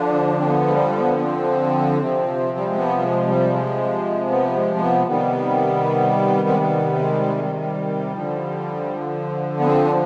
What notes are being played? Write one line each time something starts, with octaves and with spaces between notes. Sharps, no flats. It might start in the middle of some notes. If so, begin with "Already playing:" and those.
Already playing: D3 F3 D4
C4
B3
G#3
G3
B3
B3
C4
C3 F3
G3
G#3
B3
G3
G#3
G3
G#3
B3
G#3
G#3
B3
C3 D#3 G3 B3
G#3
B3
G#3
G#3
G3
G3
D3 F3
B3
C4
D4